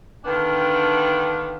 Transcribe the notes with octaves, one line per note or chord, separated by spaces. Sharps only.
D3 D#3 B3 D4 F4 G5